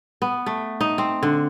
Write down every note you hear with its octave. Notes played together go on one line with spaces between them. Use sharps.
B3
A3
D#4
C4
D3